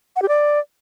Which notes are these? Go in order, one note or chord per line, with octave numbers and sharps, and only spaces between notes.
F#5
G4
D5